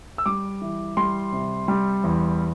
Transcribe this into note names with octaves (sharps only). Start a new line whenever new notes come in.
E6
G3 D6
E3
G3 C6
C3
G3
E2